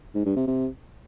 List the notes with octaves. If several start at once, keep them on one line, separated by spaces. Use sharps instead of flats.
G#2
G2
C3
C3